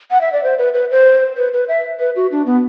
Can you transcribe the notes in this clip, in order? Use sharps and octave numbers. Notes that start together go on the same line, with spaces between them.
F#5
E5
D5
C5
B4
B4
C5
B4
B4
E5
B4
F#4
D4
B3